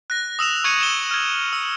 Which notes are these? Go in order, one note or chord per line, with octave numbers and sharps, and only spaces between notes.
F#6 A#6
D#6 E6 E7 F7
C#6 E6 G#6 C#7 D#7
E7 G7
F6 G#6
E6